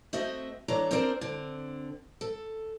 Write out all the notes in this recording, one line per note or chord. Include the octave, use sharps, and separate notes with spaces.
A3 C4 F#4 D#5 E5
E3 D4 A4 C#5 A#5
C4 D4 G#4 A#4 C5
D3 C4
A4